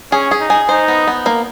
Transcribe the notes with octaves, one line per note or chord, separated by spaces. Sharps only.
C#4 G#4
G#4
D#4
G#4
D#4 C5
B3
B3
A#3